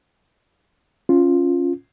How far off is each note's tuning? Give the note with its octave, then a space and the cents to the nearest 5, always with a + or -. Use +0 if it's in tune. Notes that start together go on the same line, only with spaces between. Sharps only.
C#4 -5 F4 +0